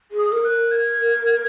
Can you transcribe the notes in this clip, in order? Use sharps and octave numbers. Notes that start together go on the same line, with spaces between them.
G#4
D#6
A#4
F#6
A#4
G#6